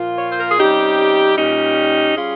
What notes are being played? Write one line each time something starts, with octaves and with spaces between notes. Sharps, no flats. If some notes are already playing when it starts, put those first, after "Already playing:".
Already playing: A#2 F3 A#3 F4
C#5
C5
A#4
G#4
C3 G3 C#4 D#4 G4
A#2 G3 C#4 D#4 G4
G3 C#4 F4 G#4